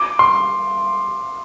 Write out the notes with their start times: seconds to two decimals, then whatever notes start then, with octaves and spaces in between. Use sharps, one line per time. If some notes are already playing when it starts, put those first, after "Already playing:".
Already playing: D6
0.19 C6